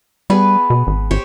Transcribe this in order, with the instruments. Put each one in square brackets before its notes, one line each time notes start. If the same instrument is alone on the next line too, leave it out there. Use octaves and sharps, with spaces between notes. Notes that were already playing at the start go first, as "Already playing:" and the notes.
[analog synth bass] G3 [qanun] B3 G#4 B4
[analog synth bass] B2
G#1
[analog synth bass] G#1 [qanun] G4 C5 C#5